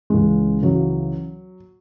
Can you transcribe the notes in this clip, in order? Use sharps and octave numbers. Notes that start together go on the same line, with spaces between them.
C#2 C#3 E3 G#3
C#2 C#3 E3 F#3